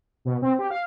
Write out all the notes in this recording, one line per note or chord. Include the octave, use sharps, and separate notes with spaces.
B2
C4
G4
F5